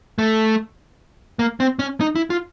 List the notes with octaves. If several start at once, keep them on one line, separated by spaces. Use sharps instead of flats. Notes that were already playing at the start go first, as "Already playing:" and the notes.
A3
A#3
C4
C#4
D#4
E4
F4